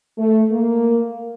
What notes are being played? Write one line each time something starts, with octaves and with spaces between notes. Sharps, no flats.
A3
A#3